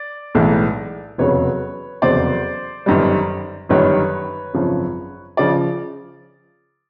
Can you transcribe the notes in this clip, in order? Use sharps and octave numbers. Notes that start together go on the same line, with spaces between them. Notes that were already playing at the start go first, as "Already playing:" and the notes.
Already playing: D5
B1 A2 E3 G#3
F1 E2 C#3 F#3 B4 C#5
F1 E2 C#3 F#3 C5 D5
G1 F#2 D#3 G3
G1 F#2 D#3 G3 B4 C#5
G#1 F#2 C#3 F3
C#3 F3 D5